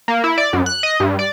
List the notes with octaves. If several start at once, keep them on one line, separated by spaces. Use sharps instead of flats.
A#3
E4
D5
F#2
F#6
D#5
G2
D5